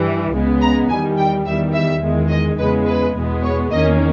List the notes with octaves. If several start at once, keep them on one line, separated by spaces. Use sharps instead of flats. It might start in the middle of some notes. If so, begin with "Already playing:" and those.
Already playing: G2 E3 G3
C#2 C#3 G#3 B3
A#5
E2 D#3 G3 G#5
G5
E2 D#3 G3 E5
E5
E2 D#3 G#3
D#5
E2 C#3 G#3 B3 B4
B4
E2 B2 G#3 B3
C#5
E2 D#3 A#3 C#4 D#5